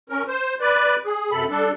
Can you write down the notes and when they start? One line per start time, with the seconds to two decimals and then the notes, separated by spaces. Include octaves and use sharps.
0.10 C#4 A#4
0.28 C5
0.61 B4 D5
1.05 G#4
1.31 F#2 C3 A4 B5
1.50 G3 D4 A4